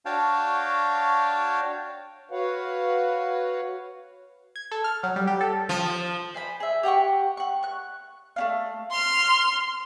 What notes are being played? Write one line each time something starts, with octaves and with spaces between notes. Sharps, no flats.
D4 F#4 C#5 F5 G5 A5
F#4 B4 C#5 F5 F#5
G#6
A4
F6
F#3
G3
G4
A4
F3
C5 G#5 B5
G#4 E5
G4 F#5 G5 C#6
F#5 C#6
C#6 F#6
A3 C#4 F5
C6 F6